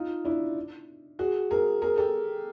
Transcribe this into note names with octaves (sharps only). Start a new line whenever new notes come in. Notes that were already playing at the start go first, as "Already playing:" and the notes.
Already playing: D#4 F4
D4 E4
F#4 G#4
G#4 A#4
G#4 A#4
G4 A4